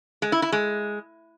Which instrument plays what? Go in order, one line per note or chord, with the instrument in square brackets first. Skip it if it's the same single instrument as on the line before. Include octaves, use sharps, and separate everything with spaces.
[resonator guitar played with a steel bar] G#3
E4
E4
G#3